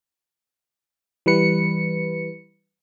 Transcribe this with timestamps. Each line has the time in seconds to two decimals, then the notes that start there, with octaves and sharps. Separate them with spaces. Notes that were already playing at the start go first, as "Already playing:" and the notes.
1.26 E3 G3 B4 C#7